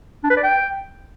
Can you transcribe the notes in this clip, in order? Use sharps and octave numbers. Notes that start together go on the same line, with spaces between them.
D4
B4
D5
G5